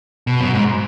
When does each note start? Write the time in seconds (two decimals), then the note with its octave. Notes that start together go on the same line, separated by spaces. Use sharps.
0.27 B2
0.41 F#2
0.54 G#2